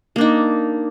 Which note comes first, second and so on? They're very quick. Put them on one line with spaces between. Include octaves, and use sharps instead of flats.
A#3 D4 D#4